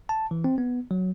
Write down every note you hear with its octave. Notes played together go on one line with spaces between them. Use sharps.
A5
E3
C4
B3
F#3